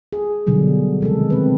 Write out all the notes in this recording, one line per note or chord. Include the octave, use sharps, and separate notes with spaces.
G#4
B2 D3 F#3 G3
C3 D#3 G#3 A4
C4 B4